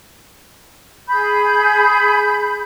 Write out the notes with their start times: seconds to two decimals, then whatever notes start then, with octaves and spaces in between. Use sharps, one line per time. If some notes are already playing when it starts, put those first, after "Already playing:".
1.08 G#4 B5 G6